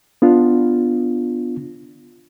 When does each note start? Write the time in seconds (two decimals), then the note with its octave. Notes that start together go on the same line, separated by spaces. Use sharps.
0.22 B3 D4 F4